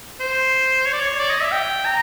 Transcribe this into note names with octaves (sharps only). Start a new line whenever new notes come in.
C5
C#5
D5
C#5
D5
D#5
E5
G5
A#5